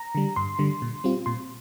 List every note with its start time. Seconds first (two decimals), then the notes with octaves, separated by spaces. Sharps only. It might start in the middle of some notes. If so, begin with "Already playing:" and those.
Already playing: A#5
0.15 D3 G3
0.36 G2 C6
0.59 D3 G3
0.82 A#2
1.04 G3 C4 F4
1.26 A#2 C6